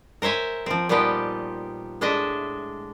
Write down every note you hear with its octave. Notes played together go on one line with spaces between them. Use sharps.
A#4 C5 C#5 E5 G#5
F3 C4
A#2 F3 G3 B3 D#4 G4
A2 G#3 D4 D#5 E5